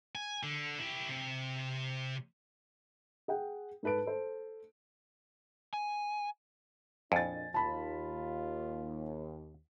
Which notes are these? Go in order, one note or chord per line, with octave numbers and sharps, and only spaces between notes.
G#5
D3
E4 G4
C3
G#4 F#5 G5
G#2 A4 B4 A5 D7
A4 C5
G#5
F2 A#2 D4 D#5 G#5 A6
D#2 F4 A5 B5